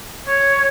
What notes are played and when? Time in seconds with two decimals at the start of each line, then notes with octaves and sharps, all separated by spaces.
0.24 C#5